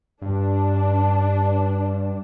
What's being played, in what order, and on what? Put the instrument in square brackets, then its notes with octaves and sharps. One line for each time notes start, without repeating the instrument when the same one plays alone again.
[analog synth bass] G2 [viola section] D4